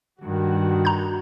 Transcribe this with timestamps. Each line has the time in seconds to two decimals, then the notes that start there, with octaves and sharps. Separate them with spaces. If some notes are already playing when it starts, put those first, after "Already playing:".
0.21 G2 D#3 F#4
0.85 A#5 G6